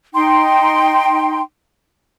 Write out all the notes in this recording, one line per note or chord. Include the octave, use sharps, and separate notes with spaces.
D#4 G5 C6